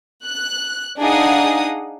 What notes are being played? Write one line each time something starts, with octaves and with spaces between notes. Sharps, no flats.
F#6
D4 D#4 G#4 F5 F#5 D#6